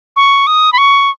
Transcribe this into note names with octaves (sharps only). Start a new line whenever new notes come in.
C#6
D#6
B5
C#6